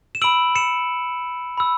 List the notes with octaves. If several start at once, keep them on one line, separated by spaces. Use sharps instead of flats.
E7
B5 E6 D7 F#7
C#7 E7
B5 E6